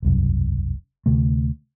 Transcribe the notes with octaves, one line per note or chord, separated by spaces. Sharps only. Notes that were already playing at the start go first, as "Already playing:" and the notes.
E1 C2 F#2
D2 C3 A3